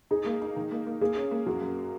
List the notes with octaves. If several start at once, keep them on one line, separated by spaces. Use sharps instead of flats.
D#4 G#4
A#3
D#4
D#3
A#3
A#3
A#3 G#4
C#4
A#3
F#2 F#4
F#2